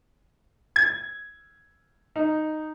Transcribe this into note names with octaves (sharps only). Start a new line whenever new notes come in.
G#6
D#4